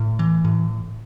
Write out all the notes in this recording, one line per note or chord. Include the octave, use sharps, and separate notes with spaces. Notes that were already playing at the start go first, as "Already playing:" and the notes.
Already playing: A2
E3
A2